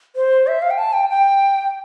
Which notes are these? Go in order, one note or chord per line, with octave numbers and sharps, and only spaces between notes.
C5
E5
F5
G5
A5
G5
G5